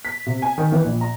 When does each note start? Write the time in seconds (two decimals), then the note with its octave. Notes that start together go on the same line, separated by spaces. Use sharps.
0.05 B6
0.26 C3
0.42 G#5
0.58 D#3
0.72 E3
0.84 A#1
1.01 A#5